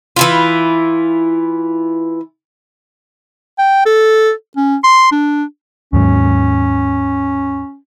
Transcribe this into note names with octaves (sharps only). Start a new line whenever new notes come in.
E3 E4 F4
G5
A4
C#4
C6
D4
D#2 G#2 F#3 C#4